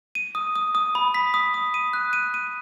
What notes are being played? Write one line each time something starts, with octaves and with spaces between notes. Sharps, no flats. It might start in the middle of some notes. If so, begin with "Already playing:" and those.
D#7
D#6
D#6
D#6
B5
B6
D#6
D#6
D#7
F#6
D#7
D#7